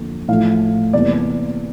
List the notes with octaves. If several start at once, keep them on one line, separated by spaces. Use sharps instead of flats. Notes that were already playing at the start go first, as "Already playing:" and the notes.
Already playing: F2 D3 F3 A#3
A2 F3 A3 F5
E2 C3 G3 A#3 D5